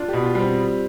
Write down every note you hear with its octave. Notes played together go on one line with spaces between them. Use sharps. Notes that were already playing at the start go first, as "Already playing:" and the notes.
Already playing: D4 F4
B2 G4
F4
G3 C4